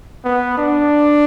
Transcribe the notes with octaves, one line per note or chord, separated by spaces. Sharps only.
B3
D4